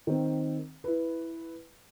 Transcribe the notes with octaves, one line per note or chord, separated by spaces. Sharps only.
D#3 C4
E4 B4